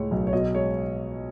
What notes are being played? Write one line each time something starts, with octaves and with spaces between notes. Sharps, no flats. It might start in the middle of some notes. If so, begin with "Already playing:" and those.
Already playing: C#2 A2 G#3 C#5
B1
C#5
B2 D#5
G#3 C#5